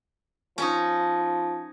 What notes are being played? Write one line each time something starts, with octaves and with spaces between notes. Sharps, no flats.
F3 C#4 D#4